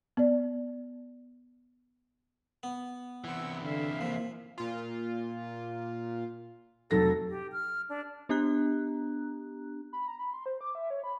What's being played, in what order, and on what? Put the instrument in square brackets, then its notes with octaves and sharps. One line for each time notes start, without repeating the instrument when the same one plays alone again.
[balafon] B3 D5
[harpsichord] B3
[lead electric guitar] C3 E3 [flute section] F#5 E6
[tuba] D3 [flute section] E5 F5
[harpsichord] F3 [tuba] A#3
[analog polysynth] A#2 F4
[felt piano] F1 F#3 A#6 [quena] A4
[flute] G4
F6
D4
[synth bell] B3 D4 G4 A#5 F#6
[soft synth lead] B5
A#5
B5
C6
C5
D6
E5
C#5
B5